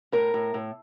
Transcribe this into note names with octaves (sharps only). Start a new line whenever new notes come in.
A2 A#4
A2
A2